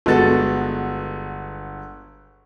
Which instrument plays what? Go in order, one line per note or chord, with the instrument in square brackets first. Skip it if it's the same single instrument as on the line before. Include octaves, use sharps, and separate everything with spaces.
[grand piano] G1 G#3 B3 F#4 A4 A6